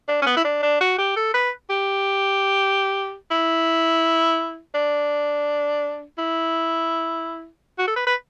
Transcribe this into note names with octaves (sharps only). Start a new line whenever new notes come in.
D4
C#4
B3
E4
D4
D4
F#4
G4
A4
B4
G4
E4
D4
E4
F#4
A4
B4
B4